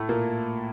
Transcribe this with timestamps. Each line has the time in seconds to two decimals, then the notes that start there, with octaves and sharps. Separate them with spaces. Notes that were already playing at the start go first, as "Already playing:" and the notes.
Already playing: A2 A3
0.09 A#2 A#3